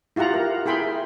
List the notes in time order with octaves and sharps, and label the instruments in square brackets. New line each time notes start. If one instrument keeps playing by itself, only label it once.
[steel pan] E4 F4 G4 F#5 A#5
A#4
E4 G#4 G5 B5 C6